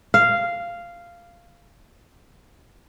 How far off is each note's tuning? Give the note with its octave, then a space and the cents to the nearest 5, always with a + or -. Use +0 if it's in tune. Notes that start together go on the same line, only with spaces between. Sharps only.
F5 -10